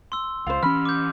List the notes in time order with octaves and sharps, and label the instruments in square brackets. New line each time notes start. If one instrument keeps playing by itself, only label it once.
[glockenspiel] C6 E6
[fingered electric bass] C#2 [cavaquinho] F4 C5
[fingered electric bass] E3 C#4 [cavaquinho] B5 [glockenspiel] F6
[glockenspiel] D6 G6